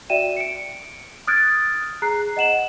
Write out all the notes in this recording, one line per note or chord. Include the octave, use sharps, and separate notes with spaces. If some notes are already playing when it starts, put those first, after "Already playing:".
F#4 D5 E5 G5 D#7 E7
C#7 D7
D#6 F6 F#6 G#6 A6 D7
G#4 A#5 F#6 C7
D#5 F#5 E7 F#7